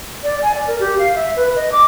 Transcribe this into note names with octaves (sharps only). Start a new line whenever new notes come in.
D5
G#5
D5
A#4
G4
F5
E5
B4
D#5
D6